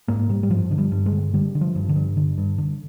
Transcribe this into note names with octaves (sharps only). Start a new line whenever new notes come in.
G#2 A#3
G#2 G3
G3
G2 F3
D3
G3
G2
G#3
D3
D3 G3
D3
F3
G2
D3
G2
D3
G2
D3